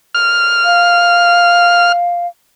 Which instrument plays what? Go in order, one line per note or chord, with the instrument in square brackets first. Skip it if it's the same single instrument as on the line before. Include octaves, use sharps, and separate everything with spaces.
[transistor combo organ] F6
[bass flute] F5